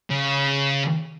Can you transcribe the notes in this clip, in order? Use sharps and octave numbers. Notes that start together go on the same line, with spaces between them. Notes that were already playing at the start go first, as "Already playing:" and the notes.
C#3